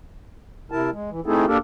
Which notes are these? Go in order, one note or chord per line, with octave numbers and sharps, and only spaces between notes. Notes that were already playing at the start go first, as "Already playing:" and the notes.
C3 E4 A#4 A5
G#3
E3
A3 C4 D#4 E4 G#4 A4
D#2 A#3 D4 G4 A4 A#4